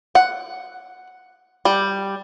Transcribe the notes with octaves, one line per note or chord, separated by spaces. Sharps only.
F#5
G3